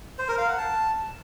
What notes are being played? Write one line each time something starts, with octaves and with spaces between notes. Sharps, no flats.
C5
A#4
F5
F#5
A5